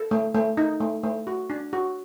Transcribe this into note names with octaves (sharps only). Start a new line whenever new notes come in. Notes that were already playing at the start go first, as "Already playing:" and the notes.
Already playing: A4
A3
A3
D#4
A3
A3
F#4
D4
F#4